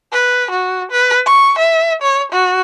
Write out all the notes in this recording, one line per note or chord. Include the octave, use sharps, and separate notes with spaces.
B4
F#4
B4
C#6
E5
C#5
F#4